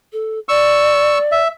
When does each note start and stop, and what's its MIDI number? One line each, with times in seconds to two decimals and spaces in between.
0.13 0.39 69
0.49 1.40 74
0.49 1.18 85
0.49 1.18 88
1.32 1.48 76